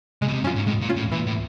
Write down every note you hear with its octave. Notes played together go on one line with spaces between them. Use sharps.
C#3 G#3
B2
C3
F#2 C#4 F4
G#2
A2 G#3
A#2
C#4 F4
A2
A#2 E3
A2